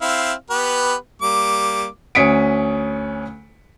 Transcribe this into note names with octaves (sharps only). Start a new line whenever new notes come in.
C4 E4 F5
B3 G4 B4
G3 A#3 D6
D2 C#4 D#6 B6 C#7 D7